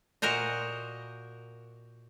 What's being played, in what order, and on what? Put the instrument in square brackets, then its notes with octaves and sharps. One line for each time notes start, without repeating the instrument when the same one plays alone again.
[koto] A#2 F#4 A#4 C5 D#5